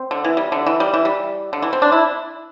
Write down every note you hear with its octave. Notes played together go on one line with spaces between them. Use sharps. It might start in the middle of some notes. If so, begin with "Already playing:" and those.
Already playing: C4
D3
E3
G3
D3
E3
G3
E3
G3
D3
E3
C4
D4
E4